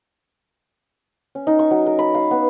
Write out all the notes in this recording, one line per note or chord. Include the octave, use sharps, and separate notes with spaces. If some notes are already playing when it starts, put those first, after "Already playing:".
C#4
D#4
C#6
F#3
A#4
B5
F5
B3